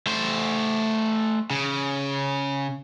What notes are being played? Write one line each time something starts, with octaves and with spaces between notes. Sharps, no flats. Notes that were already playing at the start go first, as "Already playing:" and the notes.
A3 C5
C#3